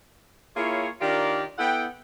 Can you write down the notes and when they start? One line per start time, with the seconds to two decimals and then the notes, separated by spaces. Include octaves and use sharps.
0.56 A#3 E4 F4 G#4 C#5
1.01 D#3 D4 F4 G4 A#4 D5
1.58 B3 E4 A4 F#5 G5